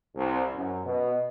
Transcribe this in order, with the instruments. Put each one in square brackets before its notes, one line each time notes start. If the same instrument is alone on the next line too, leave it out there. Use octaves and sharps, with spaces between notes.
[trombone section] C2
F#2
B2